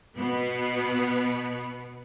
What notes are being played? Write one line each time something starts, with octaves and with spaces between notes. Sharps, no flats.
B2 B3 B5